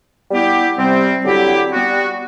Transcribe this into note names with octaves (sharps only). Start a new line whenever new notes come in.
G3 B3 E4 G4
C3 G3 C4
D3 F#3 C4 E4 G4
G3 B3 F#4